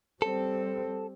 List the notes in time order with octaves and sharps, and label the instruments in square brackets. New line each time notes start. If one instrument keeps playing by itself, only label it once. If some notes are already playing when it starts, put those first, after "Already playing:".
[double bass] G3 C4 [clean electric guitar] A4